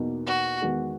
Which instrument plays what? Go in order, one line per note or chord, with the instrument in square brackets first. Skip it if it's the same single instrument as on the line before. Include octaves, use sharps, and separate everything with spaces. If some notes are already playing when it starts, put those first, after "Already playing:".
Already playing: [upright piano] E2 B2 A#3 D#4
[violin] F#4
[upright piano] E2 D#3 G#3 B3 F#4